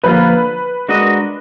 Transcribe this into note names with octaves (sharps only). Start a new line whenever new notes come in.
D3 F3 A#3 F4 B4
G#3 D4 F#4 A#4 D#5